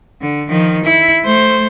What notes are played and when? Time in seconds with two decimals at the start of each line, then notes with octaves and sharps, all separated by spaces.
0.21 D3
0.49 D#3 F3
0.84 E4
1.24 A3 C5